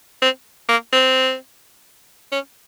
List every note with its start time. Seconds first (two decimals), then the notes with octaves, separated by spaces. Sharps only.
0.22 C4
0.69 A#3
0.93 C4
2.32 C#4